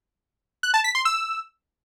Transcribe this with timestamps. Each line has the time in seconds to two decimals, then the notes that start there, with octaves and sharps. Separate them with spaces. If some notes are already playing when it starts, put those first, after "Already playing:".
0.63 F#6
0.74 A5
0.84 B6
0.95 C6
1.05 E6